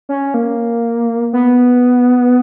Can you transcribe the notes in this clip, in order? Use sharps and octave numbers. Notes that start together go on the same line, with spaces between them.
C#4
A#3
B3